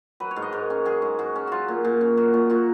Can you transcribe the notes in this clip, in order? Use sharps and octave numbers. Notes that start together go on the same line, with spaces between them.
F#3 B4
C#5
G#2
D#5
G#2 A#4
C#4
F#3 G#4
G#2
G#2 F#4
C#4
F#3 F4 F#4
A#2
A#2
C#4
F#3 F#4
A#2
A#2 F#4